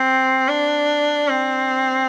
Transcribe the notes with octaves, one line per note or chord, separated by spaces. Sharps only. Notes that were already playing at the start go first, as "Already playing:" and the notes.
Already playing: C4
D4
C4